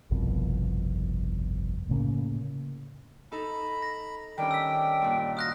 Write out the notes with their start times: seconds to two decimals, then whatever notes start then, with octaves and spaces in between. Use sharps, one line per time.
0.11 G1 C2 F2 B2
1.89 A2 C#3 A#3
3.32 D#4 A4 A#5 B5
3.82 A#6
4.38 D#3 G3 C#4 D4 G5
4.51 E6 B6
5.01 G2 A#2
5.37 F4 F#4 F5 D#6 F#6 A#6